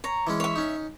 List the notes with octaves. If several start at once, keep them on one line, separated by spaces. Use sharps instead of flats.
C#5 A#5
E3 G#3 C#4
C#5 E5
C#4 D#4